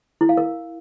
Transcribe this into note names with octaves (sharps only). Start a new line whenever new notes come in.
E4
F5
A#4